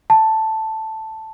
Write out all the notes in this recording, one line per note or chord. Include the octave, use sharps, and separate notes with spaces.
A5